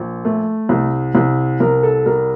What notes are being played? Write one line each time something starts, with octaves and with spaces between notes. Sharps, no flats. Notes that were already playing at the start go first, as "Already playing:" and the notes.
Already playing: A#1
A3
C2
C2
C2 A#4
A4
G3 A#4